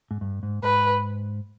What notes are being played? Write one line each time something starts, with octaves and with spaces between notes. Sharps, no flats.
G#2
G2
G#2
G#2 B4